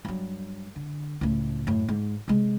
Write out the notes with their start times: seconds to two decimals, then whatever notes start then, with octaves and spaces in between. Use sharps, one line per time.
0.05 G2 F#3
0.76 D3
1.21 C#2 A2
1.67 F#2 A2
1.89 G#2
2.28 C3 G#3